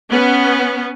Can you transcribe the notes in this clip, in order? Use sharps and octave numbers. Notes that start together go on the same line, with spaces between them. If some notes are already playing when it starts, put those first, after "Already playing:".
B3 C#4